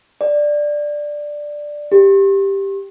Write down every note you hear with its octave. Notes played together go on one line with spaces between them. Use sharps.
D5
G4